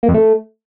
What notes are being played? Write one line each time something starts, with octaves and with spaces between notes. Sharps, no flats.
A#3
F2
A3